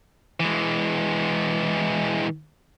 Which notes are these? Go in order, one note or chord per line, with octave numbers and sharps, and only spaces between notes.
E3 G#3